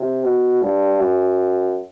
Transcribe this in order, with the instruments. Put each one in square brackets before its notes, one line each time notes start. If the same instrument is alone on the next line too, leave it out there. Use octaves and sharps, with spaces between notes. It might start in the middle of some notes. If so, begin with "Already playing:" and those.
Already playing: [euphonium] C3
B2
G2
F#2